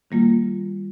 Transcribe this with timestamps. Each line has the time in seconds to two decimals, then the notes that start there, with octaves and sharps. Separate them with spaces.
0.11 D#3 G3 A#3 F4